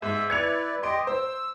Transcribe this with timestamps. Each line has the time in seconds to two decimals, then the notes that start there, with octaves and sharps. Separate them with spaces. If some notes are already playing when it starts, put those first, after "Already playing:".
0.02 G#2 E5 E6
0.30 E4 B4 D5 G#6 C#7 F7
0.83 G4 D#5 C6 D7
1.07 C5 E6